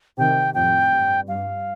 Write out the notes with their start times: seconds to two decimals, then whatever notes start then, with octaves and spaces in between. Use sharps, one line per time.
0.18 C3 D#3 G5
0.54 F2 A2 G5
0.92 G2
1.28 G2 F5